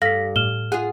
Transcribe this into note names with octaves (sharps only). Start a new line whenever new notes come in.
G2 A4 F5 A#6 B6
A2 F6 E7 G7
F4 G#4 F#5